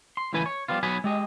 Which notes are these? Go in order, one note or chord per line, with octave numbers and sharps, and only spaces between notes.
C6
C#2 A2 E3 B4 G#5
C#5
F3 G3 B3 F4
B1 F#3 B3 G#5 B5
G#3 G4 D#5